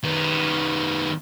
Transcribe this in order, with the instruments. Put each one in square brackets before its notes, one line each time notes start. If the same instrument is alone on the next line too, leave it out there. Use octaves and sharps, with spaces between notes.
[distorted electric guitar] D#3 B3